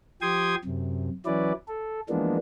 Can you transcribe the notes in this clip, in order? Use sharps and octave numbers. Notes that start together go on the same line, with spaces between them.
F3 G4 G5 C6 D#6 G#6
F#2 C3
E3 F#3 C#4 E4 B4 D5
A4
E3 F3 G#3 A#3 B3 D4